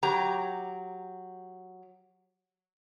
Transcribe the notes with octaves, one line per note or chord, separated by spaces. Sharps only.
F#3 G4 A#5